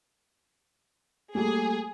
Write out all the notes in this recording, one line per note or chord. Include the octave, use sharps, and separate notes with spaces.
G3 A3 A#3 G#4